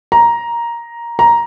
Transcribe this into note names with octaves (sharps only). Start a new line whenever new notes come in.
A#5
A#5